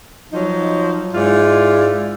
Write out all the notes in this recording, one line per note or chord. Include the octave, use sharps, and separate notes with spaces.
F3 F#3 D#4
G#2 E4 F4 D5